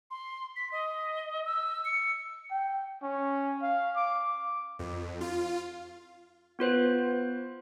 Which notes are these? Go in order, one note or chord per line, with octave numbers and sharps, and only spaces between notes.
C6
B6
D#5
E6
C#7
G5
C#4
F5
D6
F2
F4
B3 F4 B4 C5